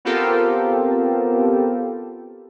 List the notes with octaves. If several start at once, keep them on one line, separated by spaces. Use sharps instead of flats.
B3 C4 F4 G4 A4 A#4